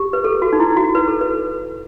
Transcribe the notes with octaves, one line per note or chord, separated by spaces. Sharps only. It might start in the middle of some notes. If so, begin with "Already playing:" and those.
Already playing: G4
B4
A4
F#4
D#4
E4
F#4
B4
A4
B4